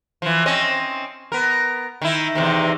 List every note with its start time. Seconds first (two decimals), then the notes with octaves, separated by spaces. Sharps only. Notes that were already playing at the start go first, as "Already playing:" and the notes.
0.22 E3 F3
0.46 C4 C#4 D#5
1.32 B3 A#4
2.02 D#3 E4
2.35 E2 C3 D#3